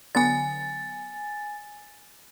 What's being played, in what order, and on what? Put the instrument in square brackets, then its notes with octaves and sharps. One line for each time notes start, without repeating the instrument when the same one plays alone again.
[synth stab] D3 F#3 B3 [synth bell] G#5 A6